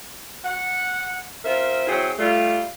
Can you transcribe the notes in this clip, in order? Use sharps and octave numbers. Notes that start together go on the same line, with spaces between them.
F#5
C4 F4 A#4 E5
F#3 C4 E4 F#4 G#4 C5
G3 A3 F4